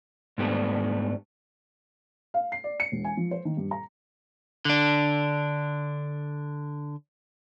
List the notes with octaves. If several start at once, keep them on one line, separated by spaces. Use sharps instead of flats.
G#2 G3 A3 B3 D4
F5
C7
D5
C#7
E1
G#5
F3
C5
D#3
G2
A#5
D3 D4